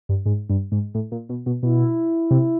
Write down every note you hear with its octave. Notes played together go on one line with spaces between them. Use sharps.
G2
G#2
G2
G#2
A2
A#2
B2
B2
B2 E4
C3